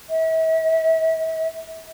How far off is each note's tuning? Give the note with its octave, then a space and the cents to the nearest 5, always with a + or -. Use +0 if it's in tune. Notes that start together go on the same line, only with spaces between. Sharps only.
E5 -40